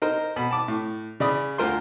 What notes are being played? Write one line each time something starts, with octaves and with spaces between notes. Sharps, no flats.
D#4 A#4 C5
B2 B5
A5 D6
A2
C#3 D5 B5 D#6
D2 F4 A#4 C5 C6